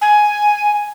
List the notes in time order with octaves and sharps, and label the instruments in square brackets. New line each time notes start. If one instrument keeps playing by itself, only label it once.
[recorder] G#5